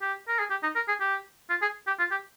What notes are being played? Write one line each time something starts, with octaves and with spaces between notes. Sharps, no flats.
G4
A#4
G#4
G4
D#4
A#4
G#4
G4
F4
G#4
G4
F4
G4